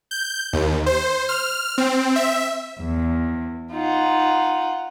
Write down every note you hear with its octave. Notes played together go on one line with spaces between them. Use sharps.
G6
D#2
C5
F6
C4
E5
E2
D#4 F4 F#5